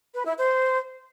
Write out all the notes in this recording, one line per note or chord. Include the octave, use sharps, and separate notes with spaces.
B4
E4
C5